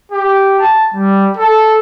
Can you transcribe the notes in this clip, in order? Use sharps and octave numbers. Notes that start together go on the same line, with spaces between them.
G4
A5
G3
A4